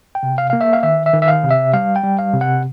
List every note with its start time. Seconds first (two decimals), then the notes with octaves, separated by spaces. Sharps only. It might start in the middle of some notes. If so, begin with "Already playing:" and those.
0.15 G5
0.23 C3
0.38 F5
0.50 A#3 F5
0.61 E5
0.73 F5
0.83 D#3 E5
1.06 E5
1.13 D#3
1.22 E5
1.28 F5
1.43 C3
1.51 E5
1.73 G3 F5
1.96 G5
2.04 G3
2.19 F5
2.33 C3
2.41 F#5